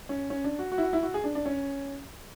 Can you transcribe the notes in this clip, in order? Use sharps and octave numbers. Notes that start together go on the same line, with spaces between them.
C#4
C#4
D4
F#4
F#4
E4
F#4
E4
F#4
G#4
D4
D4
C#4